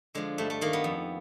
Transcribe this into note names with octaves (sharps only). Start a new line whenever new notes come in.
D3 F3 G#3
G2 A3
A3
D#3 A#3
B3
F2